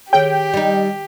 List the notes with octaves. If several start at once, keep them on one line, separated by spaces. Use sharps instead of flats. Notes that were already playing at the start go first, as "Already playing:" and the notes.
D#3 G4 G#4 C#5 G5
G3 D#4